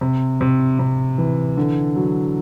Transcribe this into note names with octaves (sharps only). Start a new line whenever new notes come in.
C3
C3
C3
E3
D3
F#3